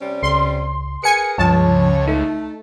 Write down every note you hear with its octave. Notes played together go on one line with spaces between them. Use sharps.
C3 G3 C#4
C#2 C6
G#4 A#4 B4 G#5 C#7
C#2 G2 F3 C#5 A5
A3 D#4